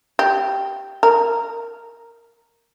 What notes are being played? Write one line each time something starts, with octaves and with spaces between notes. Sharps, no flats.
G4
A#4